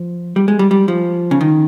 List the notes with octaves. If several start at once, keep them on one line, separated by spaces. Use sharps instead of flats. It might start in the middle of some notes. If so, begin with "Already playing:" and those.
Already playing: F3
G3
G#3
G3
G3
F3
C#3
D#3